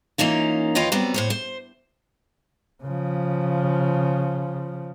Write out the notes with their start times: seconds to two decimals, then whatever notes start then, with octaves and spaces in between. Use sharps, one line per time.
0.18 E3 A#3 C#4 D#4 F4
0.75 D#2 E3 F4 C#5 D#5 G5
0.92 F#3 G3 B3 C4
1.14 A2 C5 C#5
1.30 C5
2.83 C#3 F3